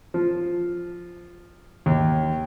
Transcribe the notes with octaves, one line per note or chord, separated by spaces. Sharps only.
F3
D#2